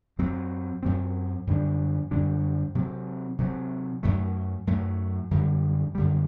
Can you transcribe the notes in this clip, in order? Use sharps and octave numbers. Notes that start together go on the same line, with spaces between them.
F#2 F#3 C4
F#2 F#3 C4
F#2 D3 G3 D4
F#2 D3 G3 D4
C3 F#3 C4
C3 F#3 C4
F#2 F#3 A3
F#2 F#3 A3
F#2 D3 G3
F#2 D3 G3